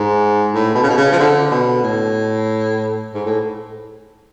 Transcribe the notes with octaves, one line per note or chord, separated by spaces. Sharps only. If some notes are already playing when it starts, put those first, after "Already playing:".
Already playing: G#2
A2
B2
C#3
B2
C#3
F3
D3
B2
A2
G#2
A2